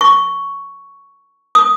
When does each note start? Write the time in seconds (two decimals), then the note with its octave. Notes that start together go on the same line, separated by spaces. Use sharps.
0.01 C#6
1.55 D#6